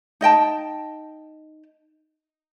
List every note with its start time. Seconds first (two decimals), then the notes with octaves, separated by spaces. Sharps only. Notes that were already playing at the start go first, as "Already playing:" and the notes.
0.21 D#4 D#5 G5 A5